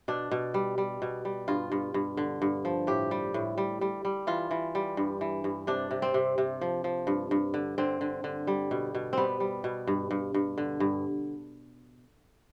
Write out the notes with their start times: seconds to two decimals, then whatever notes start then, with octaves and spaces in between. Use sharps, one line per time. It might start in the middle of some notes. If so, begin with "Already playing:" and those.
0.08 B2 D4
0.31 B2
0.54 G3
0.78 G3
1.02 B2
1.25 G3
1.48 G2 F4
1.72 G2
1.94 G2
2.17 D3
2.42 G2
2.65 F3
2.87 A2 G4
3.11 G3
3.34 A2
3.58 G3
3.81 G3
4.05 G3
4.27 E3 F4
4.51 E3
4.75 G3
4.97 G2
5.21 E3
5.44 G2
5.67 C3 D4
5.91 C3
6.02 C4
6.14 C3
6.38 C3
6.61 F3
6.84 F3
7.07 G2
7.31 G2
7.54 D3
7.78 D3 C4
8.01 D3
8.24 D3
8.47 G3
8.71 B2
8.95 B2
9.13 G3 B3 C4
9.40 G3
9.64 B2
9.87 G2
10.11 G2
10.34 G2
10.58 D3
10.80 G2